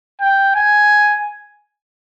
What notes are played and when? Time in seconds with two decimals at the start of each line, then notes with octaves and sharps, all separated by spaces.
0.21 G5
0.55 G#5